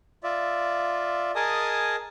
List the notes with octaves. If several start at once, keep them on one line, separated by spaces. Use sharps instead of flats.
F4 D5 E5
G#4 A#4 D#5 G#5 A5 D#6